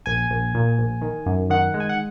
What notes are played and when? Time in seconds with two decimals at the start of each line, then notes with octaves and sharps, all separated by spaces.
0.06 A#1 G#5
0.30 A#1
0.54 A#2
0.79 A#1
1.02 D#3
1.26 F#2
1.50 D#3 F#5
1.74 G#3
1.80 G#5
1.89 F#5